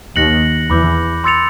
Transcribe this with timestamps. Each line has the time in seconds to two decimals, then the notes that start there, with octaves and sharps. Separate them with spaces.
0.16 D#2 D#3 F#6 A#6 C#7 F#7
0.70 E2 E3 B5 D6 G6
1.24 C6 E6 A6 C#7 F7